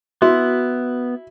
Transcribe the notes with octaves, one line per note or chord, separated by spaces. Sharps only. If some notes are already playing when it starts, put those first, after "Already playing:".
B3 E4 F#4